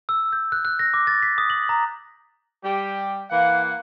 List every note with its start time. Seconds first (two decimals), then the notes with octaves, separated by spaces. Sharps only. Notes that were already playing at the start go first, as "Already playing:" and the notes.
0.09 E6
0.33 G6
0.52 F#6
0.65 F#6
0.79 A#6
0.94 D6
1.07 A6
1.22 B6
1.38 D#6
1.50 F#7
1.69 A#5
2.64 G3 G4
3.31 E3 A#3 F5 F#5